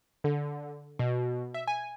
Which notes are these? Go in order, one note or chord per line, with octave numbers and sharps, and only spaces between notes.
D3
B2
E5
G#5